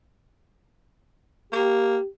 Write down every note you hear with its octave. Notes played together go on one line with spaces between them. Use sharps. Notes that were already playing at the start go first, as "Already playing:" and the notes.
A#3 G4